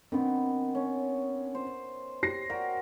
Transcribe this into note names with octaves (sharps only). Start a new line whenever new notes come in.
D#3 B3 C4 D4
C#4
C5
G4 A#6 C7
F#4 A#4 D5 G5